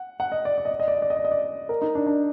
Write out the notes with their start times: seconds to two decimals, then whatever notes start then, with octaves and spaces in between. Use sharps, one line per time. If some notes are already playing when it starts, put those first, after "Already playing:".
Already playing: F#5
0.20 F#5
0.32 D#5
0.45 D5
0.58 D5
0.65 D#5
0.72 D5
0.80 D#5
0.88 D5
0.94 D#5
1.02 D5
1.10 D#5
1.17 D5
1.25 D#5
1.31 D5
1.69 A#4
1.82 D#4
1.95 D4
2.06 D4